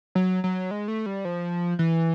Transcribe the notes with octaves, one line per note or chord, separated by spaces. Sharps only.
F#3
F#3
G#3
A3
G3
F3
E3